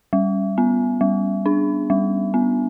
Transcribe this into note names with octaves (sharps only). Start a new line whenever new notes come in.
G3
B3
G3
D4
G3
B3